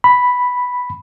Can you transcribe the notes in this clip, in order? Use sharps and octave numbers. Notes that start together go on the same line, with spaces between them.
B5